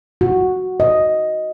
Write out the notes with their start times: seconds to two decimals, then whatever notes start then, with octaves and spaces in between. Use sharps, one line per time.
0.21 F#4
0.80 D#5